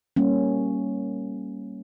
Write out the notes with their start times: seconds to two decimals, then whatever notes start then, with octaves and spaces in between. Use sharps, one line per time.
0.16 G3 A#3 C#4